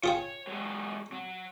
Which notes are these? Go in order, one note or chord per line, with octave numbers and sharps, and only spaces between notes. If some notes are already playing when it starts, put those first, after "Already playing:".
F4 G#4 C#5 G5
F#3 G#3
F#3